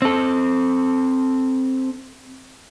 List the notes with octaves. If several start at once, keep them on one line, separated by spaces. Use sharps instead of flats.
C4 A4